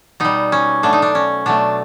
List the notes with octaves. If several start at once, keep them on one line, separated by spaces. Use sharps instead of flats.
B2 G3 D#4
C#4
B2 F#3 A3 D4
D#4
D4
C#4
B2 F#3 A3 D4